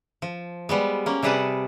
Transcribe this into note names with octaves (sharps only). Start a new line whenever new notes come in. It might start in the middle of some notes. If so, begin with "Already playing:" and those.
F3
G3 G#3 B3
A#3 C#4
C3 G3 G#4 B4 F#5 A5